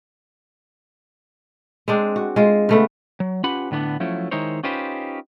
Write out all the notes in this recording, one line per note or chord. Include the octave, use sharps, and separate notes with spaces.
G#3 C4 D4
F#4
G#3 F4
C#3 A3 B3
F#3
C#4 F4 G4 B4 F#5 B5
A2 D3 B3 C#4 D4
F3 F#3 A3 C#4 E4
D#3 G#3 D#4 E4 C5 C#5
C#4 D#4 F4 G4 B4 C5